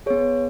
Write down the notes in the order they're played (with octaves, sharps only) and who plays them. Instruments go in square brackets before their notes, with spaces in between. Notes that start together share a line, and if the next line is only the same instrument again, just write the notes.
[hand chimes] B3 G#4 C#5